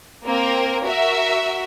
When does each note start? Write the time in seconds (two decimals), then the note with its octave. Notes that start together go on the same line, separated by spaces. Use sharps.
0.25 A#3 C4 A#4
0.84 F#4 A#4 E5